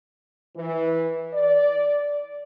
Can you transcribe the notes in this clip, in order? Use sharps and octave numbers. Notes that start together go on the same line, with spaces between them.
E3
D5